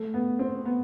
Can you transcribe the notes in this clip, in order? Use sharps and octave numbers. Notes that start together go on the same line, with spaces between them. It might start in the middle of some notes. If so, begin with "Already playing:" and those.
Already playing: A3
B3
C4
B3